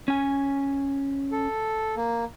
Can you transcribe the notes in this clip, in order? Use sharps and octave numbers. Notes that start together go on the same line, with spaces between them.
C#4 G#5
A4
A#3